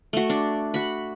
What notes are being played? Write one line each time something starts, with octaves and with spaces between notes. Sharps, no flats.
A3 F#4
D4
F#4 B5